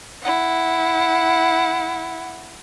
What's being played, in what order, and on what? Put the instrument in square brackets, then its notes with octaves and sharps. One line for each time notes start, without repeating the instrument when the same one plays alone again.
[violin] E4 F#5